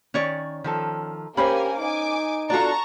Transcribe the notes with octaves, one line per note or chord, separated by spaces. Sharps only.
D#3 C#4 C#5 D5
D#3 F3 A4
A#3 C#4 G4 A#4 C5 G#5 B5
D#4 G#5 D6
D4 F4 F#4 A4 D5 A5 A#5 C#6